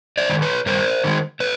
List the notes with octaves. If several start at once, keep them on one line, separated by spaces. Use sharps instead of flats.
C5 D5
D#3 G#3
B4 C#5
G2 A#4 C5
D#3 G#3
A4 B4